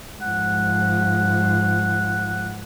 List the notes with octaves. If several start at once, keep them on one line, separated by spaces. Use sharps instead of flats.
G#2 F3 F#5